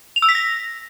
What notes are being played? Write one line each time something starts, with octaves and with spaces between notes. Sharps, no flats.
F7
E6
B6
A#6